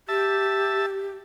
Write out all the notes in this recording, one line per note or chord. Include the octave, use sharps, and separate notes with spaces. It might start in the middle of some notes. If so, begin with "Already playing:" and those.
G4 E5 A5